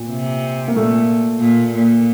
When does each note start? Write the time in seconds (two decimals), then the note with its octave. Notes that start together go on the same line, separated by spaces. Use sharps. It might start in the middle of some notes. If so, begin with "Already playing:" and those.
Already playing: A#2
0.11 C3
0.68 A#3
0.76 A#2 A3
1.40 A#2
1.73 A#2